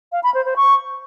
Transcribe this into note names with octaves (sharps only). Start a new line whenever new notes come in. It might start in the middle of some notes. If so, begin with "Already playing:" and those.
F5
B5
C5
C5
C#6